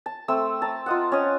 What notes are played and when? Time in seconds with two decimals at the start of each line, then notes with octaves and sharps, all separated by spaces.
0.06 A5
0.28 A3 C4 E6
0.62 A5 A#5
0.86 F4 D#5 F#5
1.12 C#4 D#5